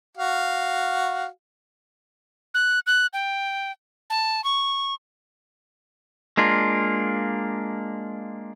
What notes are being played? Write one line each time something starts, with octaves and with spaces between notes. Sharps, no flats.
F#4 F5
F#6
F#6
G5
A5
C#6
G#3 A#3 D4 F4